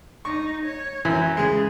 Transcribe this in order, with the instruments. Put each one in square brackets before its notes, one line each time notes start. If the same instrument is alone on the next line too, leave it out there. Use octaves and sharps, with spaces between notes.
[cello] D#4 [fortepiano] C#6
[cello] C#5
[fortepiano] F#2 [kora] E3
[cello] C#3 [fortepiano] G#3 G#4